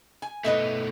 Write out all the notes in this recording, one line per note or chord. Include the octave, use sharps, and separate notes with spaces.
G#5
B2 A3 B4 D#5 E5